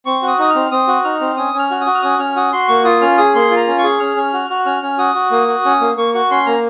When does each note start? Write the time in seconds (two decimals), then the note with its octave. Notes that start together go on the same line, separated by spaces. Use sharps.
0.06 C4 C#6
0.22 F#4
0.28 D#6
0.39 D#4 D#6
0.50 C4 F6
0.71 C4 D#6
0.88 F#4
1.04 D#4 F6
1.21 C4
1.37 C#4 D#6
1.54 C#4
1.59 F6
1.71 F#4
1.81 D#6
1.86 F#4
1.95 F6
2.03 C#4 D#6
2.19 C#4 F6
2.36 F#4 D#6
2.53 F#4 C6
2.68 A#3 C#6
2.85 F4 D#6
3.01 C#4 F6
3.18 G#4 D#6
3.35 A#3 C6
3.51 F4
3.56 A#5
3.67 C#4
3.78 C#6
3.84 G#4
4.00 C#4 F6
4.16 C#4
4.34 F#4
4.50 F#4
4.66 C#4 F6
4.82 C#4
4.98 F#4 D#6
5.15 F#4
5.31 A#3 D#6
5.48 F#4
5.65 C#4
5.81 A#3
5.97 A#3 C#6
6.14 F#4 C#6
6.31 C#4 C6
6.46 A#3 A#5